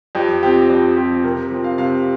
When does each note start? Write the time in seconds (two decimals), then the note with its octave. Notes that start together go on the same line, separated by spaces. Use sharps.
0.15 F2 G4
0.42 F3 C4 G4
0.69 F2 C5
0.97 F3 C4 G4
1.24 C3 A#4
1.51 F3 C4
1.64 F5
1.78 C3 F5